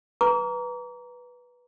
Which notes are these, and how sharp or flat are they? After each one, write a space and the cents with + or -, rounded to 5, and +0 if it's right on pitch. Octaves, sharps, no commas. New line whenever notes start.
B4 -10 A#5 +0 D6 -45